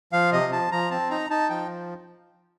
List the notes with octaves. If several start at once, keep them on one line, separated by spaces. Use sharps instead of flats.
F3 F5
C3 D#5
F3 A5
F3 A#5
C4 A5
D#4 A#5
D#4 A5
F3 G5